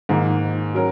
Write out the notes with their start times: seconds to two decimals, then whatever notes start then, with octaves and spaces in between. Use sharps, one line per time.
0.09 G#2 D#3 A#3
0.75 F#3 C#4 A#4